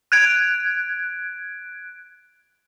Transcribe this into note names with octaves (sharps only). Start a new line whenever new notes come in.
F#6 G#6 D7